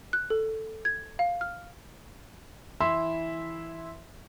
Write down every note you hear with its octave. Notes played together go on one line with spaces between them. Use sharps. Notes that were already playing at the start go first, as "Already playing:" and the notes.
F#6
A4
G#6
F5
F6
E3 E4 E5 C6